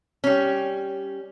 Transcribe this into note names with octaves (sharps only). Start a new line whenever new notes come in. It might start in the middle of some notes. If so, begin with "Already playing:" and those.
G3 C#4